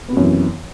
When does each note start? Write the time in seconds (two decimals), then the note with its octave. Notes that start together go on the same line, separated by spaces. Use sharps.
0.09 B3
0.13 C3
0.17 F#2
0.21 E3